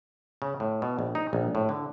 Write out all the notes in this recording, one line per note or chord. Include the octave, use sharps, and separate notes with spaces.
C#3
A2
B2
A#1
D#4
A#1
A2
D3